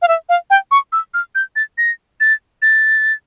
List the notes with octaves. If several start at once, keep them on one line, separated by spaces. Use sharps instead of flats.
F5
E5
F5
G5
C#6
E6
F6
G6
A6
A#6
A6
A6